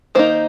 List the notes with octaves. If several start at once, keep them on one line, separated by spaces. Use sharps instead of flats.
D#3 A#3 D#4 C5